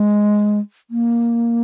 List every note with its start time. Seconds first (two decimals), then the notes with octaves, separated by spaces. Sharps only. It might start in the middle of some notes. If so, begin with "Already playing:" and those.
Already playing: G#3
0.90 A#3